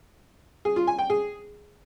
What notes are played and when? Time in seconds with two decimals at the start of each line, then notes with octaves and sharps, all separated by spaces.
0.65 G#4
0.76 F4
0.87 G#5
0.99 G5
1.10 G#4